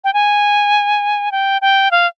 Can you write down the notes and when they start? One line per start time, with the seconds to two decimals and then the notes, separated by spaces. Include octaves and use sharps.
0.04 G5
0.14 G#5
1.32 G5
1.62 G5
1.91 F5